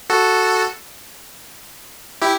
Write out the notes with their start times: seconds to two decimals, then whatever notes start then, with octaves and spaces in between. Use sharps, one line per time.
0.10 F#4 A4
2.22 E4 G4